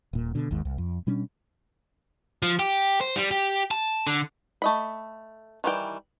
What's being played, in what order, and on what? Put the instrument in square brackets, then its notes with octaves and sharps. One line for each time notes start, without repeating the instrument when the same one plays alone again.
[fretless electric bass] D#1 A#2
B2 D3
G#1 D#2 G#2
C2
F2
B2 G3 C#4 D4
[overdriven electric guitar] F3
G4
C5
G3
G4
A5
D3
[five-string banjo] A3 D#5 B5
D#3 E3 G3 G5